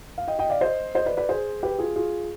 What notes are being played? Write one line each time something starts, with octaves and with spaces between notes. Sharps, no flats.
F5
D#5 G5
D#5 G5
D5 F5
C5 D#5
C5 D#5
B4 D5
B4 D5
G#4 C5
G4 B4
F4 G#4
F4 G#4